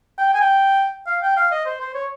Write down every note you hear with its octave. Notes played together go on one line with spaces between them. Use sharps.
G5
G#5
G5
F5
G5
F5
D#5
C5
C5
C#5